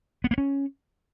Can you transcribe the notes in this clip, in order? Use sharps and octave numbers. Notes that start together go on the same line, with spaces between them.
B3
A#3
C#4